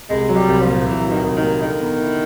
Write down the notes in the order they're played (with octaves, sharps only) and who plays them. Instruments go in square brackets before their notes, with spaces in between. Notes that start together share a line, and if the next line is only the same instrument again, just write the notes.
[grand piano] C2 [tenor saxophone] G#3
[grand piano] F#3
[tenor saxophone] G3
[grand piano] C2
[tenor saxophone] F3
[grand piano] A#2
[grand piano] C2 [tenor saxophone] E3
[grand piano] F#3
[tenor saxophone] D#3
[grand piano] C2
[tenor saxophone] D#3
[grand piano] A#2
[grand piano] D3 [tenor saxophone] D#3
[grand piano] B3
E4